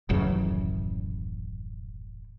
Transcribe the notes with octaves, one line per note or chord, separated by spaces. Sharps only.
D#1 A1 F#2 C#3